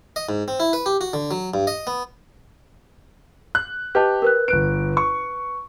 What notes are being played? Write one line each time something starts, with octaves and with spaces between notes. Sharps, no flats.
D#5
G#2
C4
E4
B4
G4
F#4
D3
F#3
G2
D#5
B3
F#6
G4 B4 D#5 A5
A#4 B4 F#6
G1 B4 F#6 D7
C#6